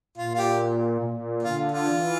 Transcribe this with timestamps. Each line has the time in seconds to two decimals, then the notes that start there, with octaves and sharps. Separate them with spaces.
0.18 A#2 F4
0.35 F4
0.38 G4
1.02 A#2
1.43 D3 F4
1.72 F4
1.86 E3